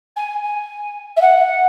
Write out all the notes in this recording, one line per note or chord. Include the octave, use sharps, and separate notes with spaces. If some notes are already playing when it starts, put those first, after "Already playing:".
G#5
G#5
E5
F#5